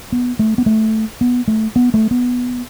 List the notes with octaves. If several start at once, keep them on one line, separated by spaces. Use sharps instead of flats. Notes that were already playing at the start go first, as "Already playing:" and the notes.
B3
A3
B3
A3
B3
A3
B3
A3
B3